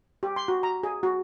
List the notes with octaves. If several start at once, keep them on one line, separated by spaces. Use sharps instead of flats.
G4
C6
F#4
A#5
G#4
F#4